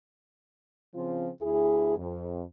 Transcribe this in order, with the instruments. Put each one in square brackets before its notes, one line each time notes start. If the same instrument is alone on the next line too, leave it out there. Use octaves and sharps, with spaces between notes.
[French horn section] C#3 F3 C4 F4
D2 E4 G#4
F2